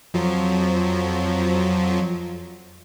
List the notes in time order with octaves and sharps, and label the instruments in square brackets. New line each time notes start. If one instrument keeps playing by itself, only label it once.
[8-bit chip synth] F2 F3 F#3